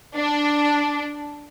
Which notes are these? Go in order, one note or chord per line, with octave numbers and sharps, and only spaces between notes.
D4